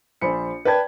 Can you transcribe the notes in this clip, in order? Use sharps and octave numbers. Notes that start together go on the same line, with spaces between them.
A#1 C5 B5 C#7
B4 D5 G5 A5 G#6